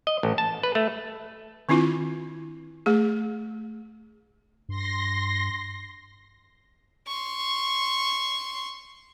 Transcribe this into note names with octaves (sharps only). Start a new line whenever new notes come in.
D#5
A1
A5
B4
A3
D#3 C4 D4 E4 F4
A3 G#4
G2 C6 A#6
C6 C#6